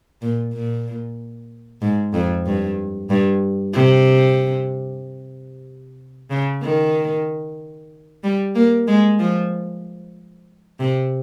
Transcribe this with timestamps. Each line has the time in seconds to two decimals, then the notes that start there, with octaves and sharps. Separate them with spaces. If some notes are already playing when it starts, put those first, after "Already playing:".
0.22 A#2
0.53 A#2
1.82 G#2
2.13 F2
2.46 G2
3.10 G2
3.74 C3
6.30 C#3
6.62 D#3
8.23 G3
8.55 A#3
8.87 G#3
9.19 F3
10.80 C3